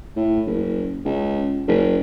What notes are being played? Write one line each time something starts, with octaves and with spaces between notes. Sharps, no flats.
A2
F#1
C#2
F#1